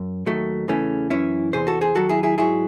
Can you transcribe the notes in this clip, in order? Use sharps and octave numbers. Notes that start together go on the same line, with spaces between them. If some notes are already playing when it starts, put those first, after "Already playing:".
Already playing: F#2
D#2 D#3 F#3 A3
E2 C#3 E3 A3 C#4
F#2 E3 C#4 E4
E2 C3 E3 G#4 C5
F#4 A4
G#4 C5
D#2 D#3 F#3 F#4 A4
E4 G#4
E4 G#4
G#2 F#3 E4 G#4